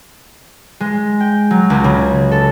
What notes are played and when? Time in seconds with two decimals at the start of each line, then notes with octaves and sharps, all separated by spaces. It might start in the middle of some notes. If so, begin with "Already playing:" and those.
0.80 G#3
1.20 G5
1.51 F#3
1.70 C#2
1.84 C#3
2.32 A4